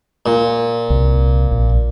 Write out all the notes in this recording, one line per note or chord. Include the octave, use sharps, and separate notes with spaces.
A#2
C2
A#1